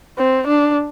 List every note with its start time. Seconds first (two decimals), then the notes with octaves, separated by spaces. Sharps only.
0.18 C4
0.48 D4